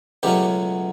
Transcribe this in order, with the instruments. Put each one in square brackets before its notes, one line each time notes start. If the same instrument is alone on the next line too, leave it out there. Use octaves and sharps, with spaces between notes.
[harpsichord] C#2 B2 F#3 A3 C#4 G4